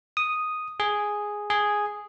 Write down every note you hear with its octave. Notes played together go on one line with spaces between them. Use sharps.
D#6
G#4
G#4